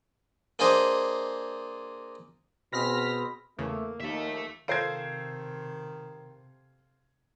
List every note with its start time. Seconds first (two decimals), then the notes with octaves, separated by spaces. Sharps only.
0.59 A#3 D4 G#4 C5 D#5
2.72 B2 C4 G#4 B5 F6 A#6 B6
3.59 E2 C#3 A3 A#3
4.01 D#2 F3 A#3 D#4 E5 A5
4.68 C3 D#3 F4 A4 C5 G#6 C7 D7